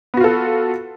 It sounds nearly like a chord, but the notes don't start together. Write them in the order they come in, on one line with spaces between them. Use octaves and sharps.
B3 F#4 F4 A4